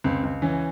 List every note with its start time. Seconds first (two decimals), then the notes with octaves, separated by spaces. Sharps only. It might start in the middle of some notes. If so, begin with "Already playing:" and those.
0.04 C#2 C4
0.23 C#2
0.42 E3 C#4